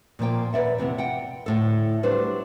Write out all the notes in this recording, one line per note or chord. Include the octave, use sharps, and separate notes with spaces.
A#2 F3 A#3 G5
D#2 B4 D5 E5 F#5
F2 C3 E3 B3
F#5 G5
D2 A2 A4
F#3 G3 D4 B4 C5